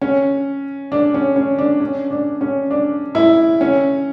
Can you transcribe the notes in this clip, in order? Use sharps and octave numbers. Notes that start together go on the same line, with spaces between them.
C#4
D4
C#4
C#4
D4
C#4
D4
C#4
D4
E4
C#4